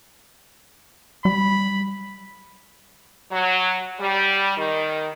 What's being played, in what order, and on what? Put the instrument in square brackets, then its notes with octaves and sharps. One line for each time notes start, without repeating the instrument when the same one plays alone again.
[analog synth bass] G3 [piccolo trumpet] B5
[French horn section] F#3
G3
D#3